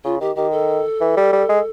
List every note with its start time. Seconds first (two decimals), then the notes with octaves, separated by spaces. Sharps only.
0.04 C#3 F4
0.21 D#3 G4
0.36 D#3 G4
0.52 A4
1.01 E3
1.17 G3
1.33 G3
1.49 G#3